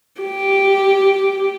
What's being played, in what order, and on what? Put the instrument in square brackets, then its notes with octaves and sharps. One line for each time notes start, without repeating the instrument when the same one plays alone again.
[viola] G4